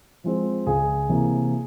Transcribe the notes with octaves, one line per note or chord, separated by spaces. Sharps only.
F3 G#3 C4
C#2 G#4
C3 E3 A#3